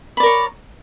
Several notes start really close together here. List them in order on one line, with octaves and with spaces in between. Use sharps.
B5 D5 A#4 C#5